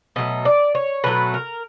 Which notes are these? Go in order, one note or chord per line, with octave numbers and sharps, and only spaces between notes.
B2 F#3 A3 D#5
D5
C#5
B2 F#3 A3 B4
A#4